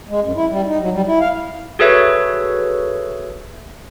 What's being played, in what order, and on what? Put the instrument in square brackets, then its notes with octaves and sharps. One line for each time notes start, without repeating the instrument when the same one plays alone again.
[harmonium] G#3
F#2
E4
G3
D#4
F#3
G3
E4
F5
[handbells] F#4 G#4 A4 B4 C#5 E5